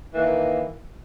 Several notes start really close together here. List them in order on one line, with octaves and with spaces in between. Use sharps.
E3 A#3 D#3